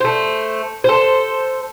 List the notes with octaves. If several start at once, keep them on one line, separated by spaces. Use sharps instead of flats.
A3 C5
A4 C5